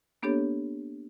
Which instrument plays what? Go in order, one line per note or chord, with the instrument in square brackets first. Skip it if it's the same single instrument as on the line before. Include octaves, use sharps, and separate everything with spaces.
[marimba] A#3 B3 D4 G4 A4 C#5